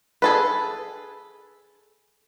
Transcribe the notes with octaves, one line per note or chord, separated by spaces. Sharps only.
G#4 A4 B4